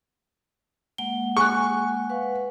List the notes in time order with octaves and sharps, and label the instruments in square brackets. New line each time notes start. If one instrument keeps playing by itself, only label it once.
[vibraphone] G#3 A#3 F#5 [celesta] G7
[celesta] G#4 G#5 F#6 [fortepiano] C#6
[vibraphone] B4 F5 F#5